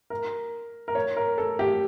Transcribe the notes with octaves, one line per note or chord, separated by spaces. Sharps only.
A#4
A#4
C#5
A#4
A4
G4